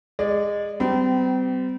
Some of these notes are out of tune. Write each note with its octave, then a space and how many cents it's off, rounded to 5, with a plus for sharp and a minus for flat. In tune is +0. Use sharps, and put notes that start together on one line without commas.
G#3 -20 D5 +0
G3 -25 C4 -40